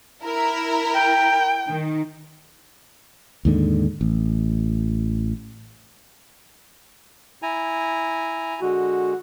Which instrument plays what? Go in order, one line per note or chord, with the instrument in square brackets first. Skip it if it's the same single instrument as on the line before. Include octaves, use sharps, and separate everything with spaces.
[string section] E4 A#4
[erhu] G5
[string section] D#3
[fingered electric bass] D#2 G#2 D3
A1
[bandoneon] E4 G#5 A#5
[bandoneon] D3 G#3 [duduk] F#4